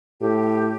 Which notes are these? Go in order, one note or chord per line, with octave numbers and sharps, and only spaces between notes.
A2 G4